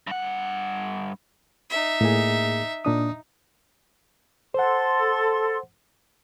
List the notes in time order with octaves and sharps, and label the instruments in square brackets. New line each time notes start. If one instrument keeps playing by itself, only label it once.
[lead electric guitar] G2 F#5
[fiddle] D#4 E5
[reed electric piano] A2 A#3 G#4
[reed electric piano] A#2 D4 D#6 [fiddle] D#4
[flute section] A4 C6 [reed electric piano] C5 F#5